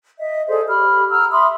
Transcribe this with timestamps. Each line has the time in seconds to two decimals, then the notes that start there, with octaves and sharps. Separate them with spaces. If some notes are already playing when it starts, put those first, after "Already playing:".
0.19 D#5 E5
0.48 G#4 A4 C5 D5
0.67 G4 B5 F6
1.10 F#5 A#5 E6 F6
1.31 E5 B5 C6 D#6